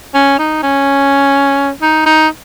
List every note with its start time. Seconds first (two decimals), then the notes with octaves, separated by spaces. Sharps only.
0.14 C#4
0.39 D#4
0.63 C#4
1.82 D#4
2.06 D#4